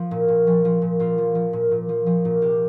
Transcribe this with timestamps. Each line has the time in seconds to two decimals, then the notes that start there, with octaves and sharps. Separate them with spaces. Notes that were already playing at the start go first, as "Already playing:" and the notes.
Already playing: F3
0.11 A#2
0.28 A#2
0.47 F3
0.65 F3
0.82 A#2
1.00 A#2 F4
1.18 F3
1.35 F3
1.53 A#2
1.71 A#2
1.89 F3
2.06 F3
2.25 A#2
2.42 C3 G4